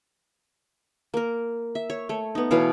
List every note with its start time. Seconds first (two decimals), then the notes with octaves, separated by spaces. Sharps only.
1.14 A#3 A#4
1.75 E5
1.90 C#5
2.09 A3 C#5
2.35 B3 D#4
2.51 B2 E3 C#5 F5